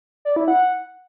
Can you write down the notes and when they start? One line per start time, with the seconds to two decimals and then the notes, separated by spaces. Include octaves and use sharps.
0.25 D5
0.36 E4
0.48 F#5